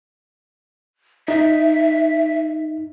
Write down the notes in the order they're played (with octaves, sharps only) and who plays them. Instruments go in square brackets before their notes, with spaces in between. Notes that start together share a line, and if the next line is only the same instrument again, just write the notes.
[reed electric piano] D#4 [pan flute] E5